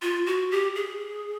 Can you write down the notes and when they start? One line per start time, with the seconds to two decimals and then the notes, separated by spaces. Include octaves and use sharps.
0.02 F4
0.26 F#4
0.51 G4
0.75 G#4